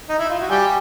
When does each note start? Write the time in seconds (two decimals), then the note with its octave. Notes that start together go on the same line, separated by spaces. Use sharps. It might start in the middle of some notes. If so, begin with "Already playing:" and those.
0.09 D#4
0.19 E4
0.30 F4
0.40 F#4
0.50 G3 G4 G#5